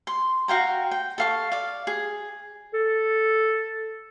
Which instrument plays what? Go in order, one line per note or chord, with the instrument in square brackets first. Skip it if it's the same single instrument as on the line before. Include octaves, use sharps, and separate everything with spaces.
[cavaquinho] C6
F#4 F5 G5 A#5
G5
A4 F5 C#6
D5 F5
G#4
[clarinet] A4